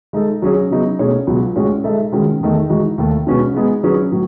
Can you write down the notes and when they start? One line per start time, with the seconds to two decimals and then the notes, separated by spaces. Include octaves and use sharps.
0.13 G#3 D#4 A4
0.42 F#3 C#4 G#4 C#5
0.71 C#3 F#3 B3 D#4
0.99 B2 A3 C#4 G#4 C#5
1.27 C#2 B2 F#3
1.56 A2 G#3 C#4 F#4 C#5
1.84 G#3 D#4 A4 E5
2.12 D#3 G#3 C#4 F#4
2.41 E2 D#3 A3 D#4
2.69 E3 G#3 D#4 F#4
2.98 D#2 D#3 A3
3.27 B2 G#3 C#4 F#4 B4
3.54 G#3 B3 D#4 G#4
3.83 F#3 C#4 G#4 B4
4.12 A2 F#3